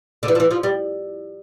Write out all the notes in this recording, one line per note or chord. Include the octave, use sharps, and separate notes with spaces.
D3
E3
F3
E3
F3
G3